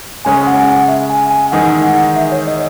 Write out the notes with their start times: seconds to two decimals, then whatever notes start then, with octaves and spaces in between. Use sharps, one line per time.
0.25 C#3 G#3 C#4 G#4 G#5
0.47 F#5
0.59 G#5
0.68 F#5
0.88 E5
1.10 G#5
1.30 G#5
1.52 E2 D#3 G#3 D#4 G#4 F#5
1.83 F#5
2.16 E5
2.32 C#5
2.47 D#5